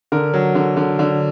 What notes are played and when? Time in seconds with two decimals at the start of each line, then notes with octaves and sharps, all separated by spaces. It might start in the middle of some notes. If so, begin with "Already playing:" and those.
0.12 D3 A#4
0.34 F#3
0.55 D3
0.77 D3
0.99 D3